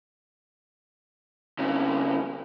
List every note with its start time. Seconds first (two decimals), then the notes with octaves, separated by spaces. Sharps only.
1.59 F2 C#3